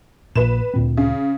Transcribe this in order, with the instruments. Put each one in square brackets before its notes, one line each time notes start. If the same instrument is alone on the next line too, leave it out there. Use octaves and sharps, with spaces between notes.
[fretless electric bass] A#1 A#2 [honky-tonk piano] B4 E7
[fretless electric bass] D2 A#2 C4
[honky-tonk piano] C#3